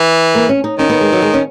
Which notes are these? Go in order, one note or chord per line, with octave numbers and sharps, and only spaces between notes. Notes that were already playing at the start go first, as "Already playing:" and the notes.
Already playing: E3
A#3
C#4
D#4
D#3 C#4
B3
G#3
F#3
G#3
C#4